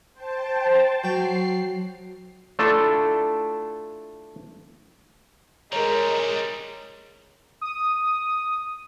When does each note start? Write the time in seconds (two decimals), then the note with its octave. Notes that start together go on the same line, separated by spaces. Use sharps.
0.13 C5 G5 A5
1.04 F#3 G5 C7
2.59 A3 D4 E4 F4 A4
5.73 D#3 G3 G#3 A#4 C#5 A#5
7.61 D#6